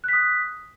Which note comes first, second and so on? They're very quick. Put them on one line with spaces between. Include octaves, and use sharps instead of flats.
F#6 B6 D#6